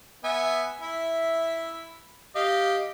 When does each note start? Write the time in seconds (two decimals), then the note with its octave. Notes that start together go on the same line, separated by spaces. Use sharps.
0.24 B3 E5 G#5
0.81 E4 E5
2.35 G4 D#5 F5